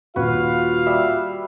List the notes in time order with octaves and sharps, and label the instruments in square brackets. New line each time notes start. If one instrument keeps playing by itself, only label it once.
[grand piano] D#1 [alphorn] F4 [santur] F#4 B4 C#5 [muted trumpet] F5
[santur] G3 E5